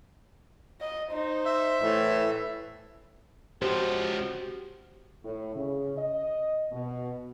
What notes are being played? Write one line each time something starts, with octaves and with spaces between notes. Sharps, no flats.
D#5
D#4 C5
E5
A2 E3
C#2 F3 F#4 G4 C5
A2
C#3
D#5
B2